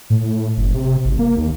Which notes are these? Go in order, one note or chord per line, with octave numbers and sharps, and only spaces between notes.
A2
F#1
C3
G#1
A#3
D#2